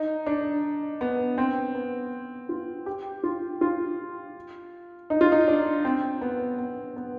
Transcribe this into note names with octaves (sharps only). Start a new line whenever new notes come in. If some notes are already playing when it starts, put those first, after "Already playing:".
Already playing: D#4
D4
B3
C4
B3
F4
G4
F4
F4
D#4
F4
D#4
D4
C4
B3
B3
B3